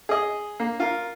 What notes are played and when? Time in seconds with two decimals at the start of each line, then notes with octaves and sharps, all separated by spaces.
0.09 G#4 D#5
0.60 A#3
0.80 F4 A#4